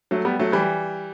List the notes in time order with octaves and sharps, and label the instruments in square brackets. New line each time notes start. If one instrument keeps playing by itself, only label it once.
[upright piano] F#3 A3
G3 B3
F#3 A3
E3 G3